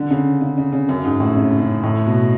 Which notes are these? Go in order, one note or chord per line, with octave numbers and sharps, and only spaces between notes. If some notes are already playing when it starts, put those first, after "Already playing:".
Already playing: D3
C#3
C#3
C#3
C#3
F#2
G#2
A2
C#3
C#3
A2
B2